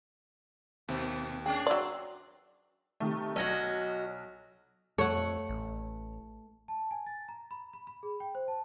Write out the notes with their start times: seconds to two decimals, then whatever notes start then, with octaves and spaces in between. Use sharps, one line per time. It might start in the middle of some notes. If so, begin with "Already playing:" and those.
0.88 D#2 B2
1.46 C#4 D4 G#4 G5
1.67 F#3 D5 C6 E6
3.00 C3 D#3 A3
3.36 B1 F#4 C#5 D#5 A#6
4.98 F2 A3 C#5 F#5
5.49 A1
6.68 A5
6.91 G#5
7.06 A6
7.29 A#5
7.51 B5
7.73 B5
7.87 B5
8.03 G#4
8.20 G5
8.35 C5
8.48 A5